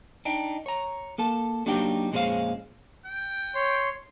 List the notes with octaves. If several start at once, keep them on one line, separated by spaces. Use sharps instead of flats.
D4 D#4 G5
C#5 A#5
A#3 A4 A5
F#3 A#3 D4 D#4 G4 G5
F2 A#2 G#3 C#4 C5 F5
G5
C#5 C6